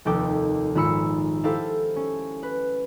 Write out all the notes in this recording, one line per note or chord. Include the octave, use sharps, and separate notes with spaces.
F1 D#2 A4 G5 D6
D#1 G#1 F4 B5 E6 C#7
E4 G4 A4 C5 F5 A5
C#4
B4